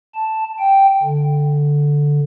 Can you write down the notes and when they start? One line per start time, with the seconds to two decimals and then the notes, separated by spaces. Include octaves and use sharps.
0.15 A5
0.59 G5
1.03 D3